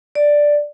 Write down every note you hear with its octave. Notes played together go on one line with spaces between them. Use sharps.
D5